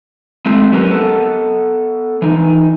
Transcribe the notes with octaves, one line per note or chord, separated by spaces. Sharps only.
G#3 A3 C4 E4
F#3 C#4 G4 A#4 B4
B3 A4
E3 D#4